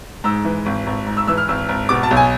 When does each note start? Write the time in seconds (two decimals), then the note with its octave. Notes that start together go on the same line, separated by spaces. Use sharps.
0.24 G#2 E6
0.45 E3
0.66 G#1
0.87 G#1
1.06 G#2
1.17 E6
1.27 E3 E6
1.38 F6
1.48 G#1 E6
1.69 G#1
1.89 B2 D6
2.03 A5
2.11 B1
2.17 G#5